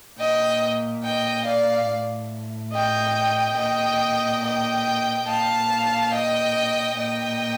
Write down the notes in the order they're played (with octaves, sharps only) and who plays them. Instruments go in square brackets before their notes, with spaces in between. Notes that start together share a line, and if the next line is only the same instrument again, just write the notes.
[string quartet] A#2 D#5 G5
D#5 G5
D5 F5
A2
D#5 G5
A#2 D#5 G5
D#5 G5
A#2 F5 A5
D#5 G5
A#2 D#5 G5